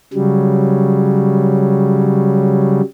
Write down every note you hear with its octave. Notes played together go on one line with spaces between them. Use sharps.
C#3 F#3 G3